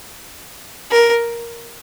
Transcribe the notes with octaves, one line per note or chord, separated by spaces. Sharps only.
A#4